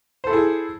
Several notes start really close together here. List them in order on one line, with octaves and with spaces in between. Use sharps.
C5 A4 E4 G#4